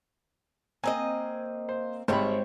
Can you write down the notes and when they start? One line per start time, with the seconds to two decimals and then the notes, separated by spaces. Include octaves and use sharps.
0.84 A#3 C4 D#5 G#5
1.69 C5
2.08 G#1 G3 C5 C#5 G5 B5